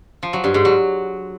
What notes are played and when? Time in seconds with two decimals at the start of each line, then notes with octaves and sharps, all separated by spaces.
0.23 F3
0.33 F#3
0.44 G2
0.54 G#2
0.65 F#3